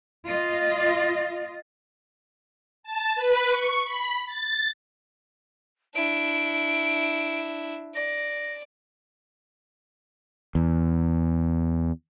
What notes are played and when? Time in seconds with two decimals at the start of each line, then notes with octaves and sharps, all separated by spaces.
0.25 F4 D#5
2.83 A5
3.15 B4
3.49 C#6
3.84 B5
4.26 A6
5.95 D4 E4 D7
7.95 D5 A#6
10.55 E2